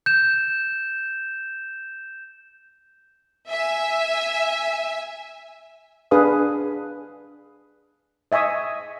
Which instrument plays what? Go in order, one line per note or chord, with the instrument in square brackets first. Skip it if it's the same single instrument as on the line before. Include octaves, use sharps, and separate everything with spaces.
[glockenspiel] G6 E7
[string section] E5 G#5
[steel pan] D4 G#4 B4 F5 D#6
D#5 E5 G#5 C#6 D#6